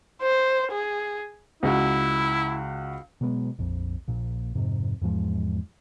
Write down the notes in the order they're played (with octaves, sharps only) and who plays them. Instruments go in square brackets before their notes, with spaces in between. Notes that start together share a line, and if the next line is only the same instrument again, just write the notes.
[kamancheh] C5
G#4
[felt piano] C#2 F#4 [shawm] E4
[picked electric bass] B2 F#3 G#3 B3
A#1 F2
A#1 A#2
F2 G#2 C3
E2 G#2 F3 G#3